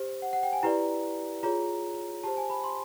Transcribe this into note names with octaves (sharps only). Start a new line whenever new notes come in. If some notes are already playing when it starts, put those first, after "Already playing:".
Already playing: G4 C5
F#5
F#5
G5
G#5
E4 G4 B4 D5 A#5
F4 G#4 C#5 A#5
G4 C5 A5
G#5
B5
C6